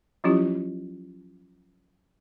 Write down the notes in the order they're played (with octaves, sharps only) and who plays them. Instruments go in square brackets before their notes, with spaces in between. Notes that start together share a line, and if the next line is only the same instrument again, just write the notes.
[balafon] F3 F#3 C#4 E4 F4 G4